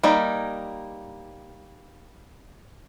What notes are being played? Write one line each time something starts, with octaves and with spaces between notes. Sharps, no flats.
G3 A#3 D#4